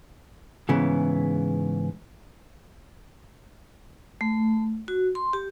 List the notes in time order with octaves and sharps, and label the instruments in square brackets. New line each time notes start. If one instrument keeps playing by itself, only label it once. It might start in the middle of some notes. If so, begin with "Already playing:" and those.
[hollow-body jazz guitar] G#2 C#3 E3 B3
[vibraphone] A3
F#4
C6
G4